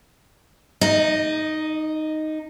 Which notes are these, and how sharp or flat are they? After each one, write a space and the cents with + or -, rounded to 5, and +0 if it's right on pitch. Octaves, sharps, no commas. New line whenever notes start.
D#4 +0 D#5 -45